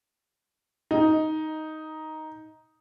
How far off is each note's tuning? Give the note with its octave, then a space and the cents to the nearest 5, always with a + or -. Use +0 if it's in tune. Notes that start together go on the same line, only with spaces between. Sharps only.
D#4 +5